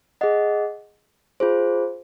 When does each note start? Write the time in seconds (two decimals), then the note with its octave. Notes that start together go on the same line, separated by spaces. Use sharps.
0.21 G#4 D#5 F#5
1.40 F4 G#4 C5